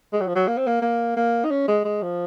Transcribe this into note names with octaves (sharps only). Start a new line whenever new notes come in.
G#3
F#3
F3
F#3
A#3
C4
A#3
A#3
A#3
D#4
C#4
G#3
G#3
F3